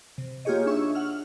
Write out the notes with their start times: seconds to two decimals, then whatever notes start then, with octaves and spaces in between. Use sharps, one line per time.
0.18 C3
0.45 A#3 F4 G4 G#4 C#5 D#5
0.66 D4 D#4 G#4 E5 C#6 E6
0.95 F#5 F6